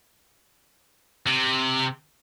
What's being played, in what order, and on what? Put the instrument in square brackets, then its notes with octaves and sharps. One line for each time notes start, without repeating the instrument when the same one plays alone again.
[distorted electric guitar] C3